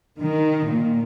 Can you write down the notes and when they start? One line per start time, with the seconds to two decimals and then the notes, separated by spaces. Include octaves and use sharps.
0.22 D#3
0.70 A#2